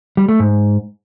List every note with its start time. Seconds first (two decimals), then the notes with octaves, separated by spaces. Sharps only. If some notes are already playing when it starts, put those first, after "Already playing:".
0.17 G3
0.28 A3
0.40 G#2